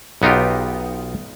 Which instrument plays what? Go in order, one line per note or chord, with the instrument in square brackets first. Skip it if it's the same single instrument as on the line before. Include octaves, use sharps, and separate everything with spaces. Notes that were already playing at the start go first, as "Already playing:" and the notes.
[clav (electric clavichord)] B1 B3 D#4 F4 G4